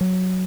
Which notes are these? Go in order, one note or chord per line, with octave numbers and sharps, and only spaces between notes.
F#3